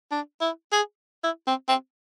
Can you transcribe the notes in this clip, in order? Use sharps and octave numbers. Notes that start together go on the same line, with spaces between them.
D4
E4
G#4
E4
C4
C4